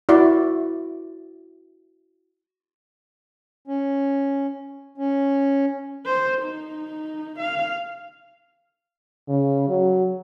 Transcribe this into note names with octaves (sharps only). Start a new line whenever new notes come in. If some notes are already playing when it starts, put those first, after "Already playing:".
E4 F#4 D5
C#4
C#4
C5
D#4
F5
C#3
F#3